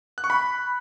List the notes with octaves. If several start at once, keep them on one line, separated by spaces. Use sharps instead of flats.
F#6
C#6
B5